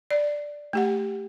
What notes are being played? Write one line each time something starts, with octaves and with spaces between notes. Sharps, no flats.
D5
A3 G4 F#5